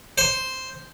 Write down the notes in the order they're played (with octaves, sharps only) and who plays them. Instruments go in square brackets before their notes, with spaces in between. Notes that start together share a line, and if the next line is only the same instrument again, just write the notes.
[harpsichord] C5